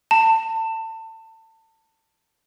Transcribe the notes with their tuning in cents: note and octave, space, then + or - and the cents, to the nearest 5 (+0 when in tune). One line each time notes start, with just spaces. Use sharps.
A5 +30